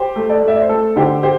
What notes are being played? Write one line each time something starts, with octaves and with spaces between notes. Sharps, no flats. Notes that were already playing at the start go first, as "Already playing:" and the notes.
Already playing: G4 C5
A3
A4 D5
A3
E5
D5
C5
A3 A4
D3 G4 C5
G4 C5